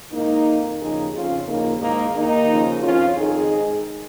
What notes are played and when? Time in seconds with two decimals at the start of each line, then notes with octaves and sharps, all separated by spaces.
0.12 G#2 D#3 A#3 D#4
0.45 F2 D#3
0.80 D#2 C#3 F3 D#4 G#4
1.13 F2 C#3 F3 C#4 F4
1.47 D#2 C#3 F3 A#3 D#4
1.81 G#2 D#3 A#3 D#4
2.15 D#2 D#3 A#3 D#4
2.49 D#2 C#3 F3
2.82 F2 F3 C#4 F4
3.16 F2 D#3 D#4 G#4
3.50 G#2 D#3